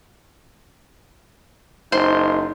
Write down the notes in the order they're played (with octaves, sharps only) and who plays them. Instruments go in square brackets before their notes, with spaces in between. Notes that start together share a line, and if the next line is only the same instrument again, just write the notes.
[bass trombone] F#1 [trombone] D#4 [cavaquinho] C5 C6